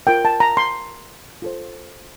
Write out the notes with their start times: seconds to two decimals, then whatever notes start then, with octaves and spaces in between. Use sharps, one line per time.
0.07 F4 A#4 G5
0.25 A5
0.40 A#5
0.57 C6
1.42 F4 A4 C5